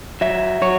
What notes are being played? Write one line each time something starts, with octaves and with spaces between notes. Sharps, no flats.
F#3 E5
F#3 C#5